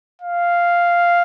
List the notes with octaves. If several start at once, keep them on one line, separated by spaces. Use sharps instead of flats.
F5